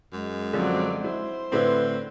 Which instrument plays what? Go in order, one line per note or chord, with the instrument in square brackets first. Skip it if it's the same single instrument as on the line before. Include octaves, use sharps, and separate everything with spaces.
[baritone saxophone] F#2 [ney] G#3
[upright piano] D3 F3 [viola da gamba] F#3 C4 D5
[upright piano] E4 [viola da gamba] C5
[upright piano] A2 D3 E4 [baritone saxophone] C4 [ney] B4